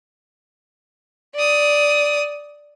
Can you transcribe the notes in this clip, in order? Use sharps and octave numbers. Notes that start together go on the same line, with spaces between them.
D5 D#6